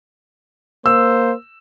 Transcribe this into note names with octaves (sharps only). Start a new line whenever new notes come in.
A#3 C5 E6